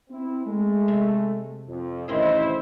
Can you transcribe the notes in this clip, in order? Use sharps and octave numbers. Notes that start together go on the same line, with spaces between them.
C4 E4
G#3 A3
C3
F2
A1 D#3 C4 E4 G#4 C5